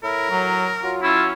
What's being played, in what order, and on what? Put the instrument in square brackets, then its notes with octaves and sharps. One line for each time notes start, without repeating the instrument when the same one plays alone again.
[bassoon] A2 [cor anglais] E4 [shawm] A#4
[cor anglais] F#3
[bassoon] F#3 [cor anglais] F4
[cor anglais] C#4 [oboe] E4 [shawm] F4